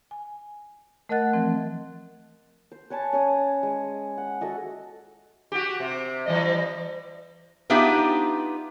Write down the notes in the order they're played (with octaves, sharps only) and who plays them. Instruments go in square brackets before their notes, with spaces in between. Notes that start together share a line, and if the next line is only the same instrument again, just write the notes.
[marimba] G#5
A3 A#4 D#5 F#5 F#6 A6
E3 F3 C4
[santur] C5
B4 C#5 G#5 A5
C#4 C#5 D#6
G#3
F#5
F#4 A4 D#5 E5
[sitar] F#4 G4
C3
E3 G3 D#5
[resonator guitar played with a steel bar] B3 D4 D#4 F4 G4 E5